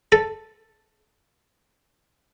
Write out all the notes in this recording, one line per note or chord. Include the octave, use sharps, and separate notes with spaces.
A4